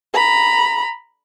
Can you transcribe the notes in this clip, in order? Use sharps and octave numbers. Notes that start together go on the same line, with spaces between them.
A#5 B5